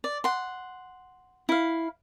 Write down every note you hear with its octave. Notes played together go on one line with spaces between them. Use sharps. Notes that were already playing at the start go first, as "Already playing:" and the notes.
D5
F#5 C6
E4 F5